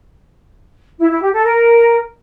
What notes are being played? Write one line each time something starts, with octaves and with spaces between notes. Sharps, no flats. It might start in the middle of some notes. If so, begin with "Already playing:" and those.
E4
E4
G4
A4
A#4